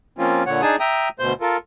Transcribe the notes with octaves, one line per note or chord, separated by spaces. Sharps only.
F3 A#3 C4 C#4 F4
A#2 D3 C#5 F#5
D4 D#4 G#4 G#5 A5 D#6
E5 G5 A#5 D#6
D2 B2 C5 G6
F4 A4 A#4